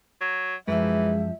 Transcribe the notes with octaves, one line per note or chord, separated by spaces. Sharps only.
F#3
F#2 E3 F3 G#3 E5